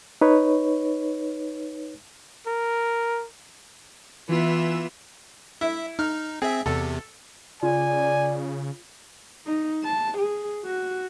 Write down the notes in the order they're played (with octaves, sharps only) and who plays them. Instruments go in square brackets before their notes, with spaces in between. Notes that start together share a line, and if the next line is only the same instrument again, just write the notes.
[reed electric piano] D#4 B4 C#5
[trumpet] A#4
[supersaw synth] E3 E5 E7 [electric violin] B3 F4
[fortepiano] E4 [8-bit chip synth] E5
[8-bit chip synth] D#4 [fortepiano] F6
[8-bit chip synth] C4 E5 [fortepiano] G#4
[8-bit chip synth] E2 C3 [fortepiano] A4
[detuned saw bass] C#3 [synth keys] F4 [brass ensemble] D5 [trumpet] G#5
[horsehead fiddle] D#4
A5
G#4
F#4